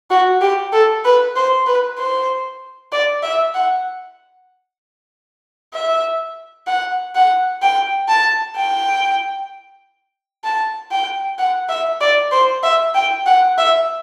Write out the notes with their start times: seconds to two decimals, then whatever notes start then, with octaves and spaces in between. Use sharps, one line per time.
0.11 F#4
0.41 G4
0.73 A4
1.04 B4
1.36 C5
1.66 B4
1.98 C5
2.92 D5
3.23 E5
3.54 F#5
5.74 E5
6.67 F#5
7.15 F#5
7.62 G5
8.08 A5
8.57 G5
10.44 A5
10.91 G5
11.38 F#5
11.69 E5
12.01 D5
12.32 C5
12.63 E5
12.95 G5
13.26 F#5
13.58 E5